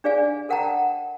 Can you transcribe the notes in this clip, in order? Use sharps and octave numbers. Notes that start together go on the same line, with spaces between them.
D4 G#4 D5 F5 G#5
A4 A#4 F#5 G5 A5 A#5